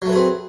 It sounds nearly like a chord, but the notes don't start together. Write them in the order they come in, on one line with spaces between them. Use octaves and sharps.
F#3 A3 B4 G#4 C4